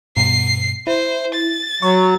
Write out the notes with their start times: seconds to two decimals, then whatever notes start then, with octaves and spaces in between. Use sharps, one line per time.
0.17 G2 B2 C7
0.87 E4 C5
1.35 A6
1.82 F#3 C#6